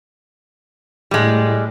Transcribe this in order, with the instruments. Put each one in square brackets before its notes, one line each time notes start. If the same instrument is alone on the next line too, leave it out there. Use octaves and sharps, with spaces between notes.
[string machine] A2 [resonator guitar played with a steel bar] G3 G#3